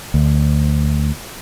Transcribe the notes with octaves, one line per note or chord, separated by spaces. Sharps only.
D2